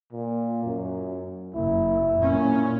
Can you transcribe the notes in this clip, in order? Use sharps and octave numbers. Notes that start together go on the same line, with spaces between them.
A#2
F#2
F#1 E4
A#2 C#4